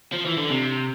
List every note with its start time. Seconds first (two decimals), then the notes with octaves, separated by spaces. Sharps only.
0.13 F3
0.26 E3
0.38 D3
0.50 C3